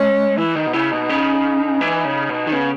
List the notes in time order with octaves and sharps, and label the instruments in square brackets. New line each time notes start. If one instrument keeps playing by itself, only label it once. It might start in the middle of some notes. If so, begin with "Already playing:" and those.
Already playing: [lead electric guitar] G#3 [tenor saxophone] C#4
[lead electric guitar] E3 [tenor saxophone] E4
[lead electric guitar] D#3 [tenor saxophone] D#4
[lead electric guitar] B2
[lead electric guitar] C#3 [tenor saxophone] E4
[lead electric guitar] B2 [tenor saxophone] D#4
[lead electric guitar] C#3
E3
C#3
B2
D#3
[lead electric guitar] C#3 [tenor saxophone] B3